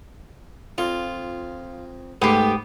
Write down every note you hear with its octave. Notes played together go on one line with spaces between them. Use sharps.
F2 F4 D#5
G#2 A3 B3 G4 G5 C7